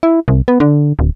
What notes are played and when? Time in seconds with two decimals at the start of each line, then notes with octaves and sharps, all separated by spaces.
0.03 E4
0.28 C2
0.48 B3
0.60 D3
0.99 D1